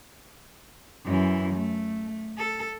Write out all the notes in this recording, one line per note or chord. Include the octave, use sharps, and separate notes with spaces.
F#2 E3
A3
A4